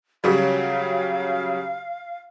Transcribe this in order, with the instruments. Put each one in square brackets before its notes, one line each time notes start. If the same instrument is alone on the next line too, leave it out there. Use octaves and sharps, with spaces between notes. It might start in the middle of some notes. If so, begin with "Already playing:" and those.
[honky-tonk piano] C#3 F#3 G3 [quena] F5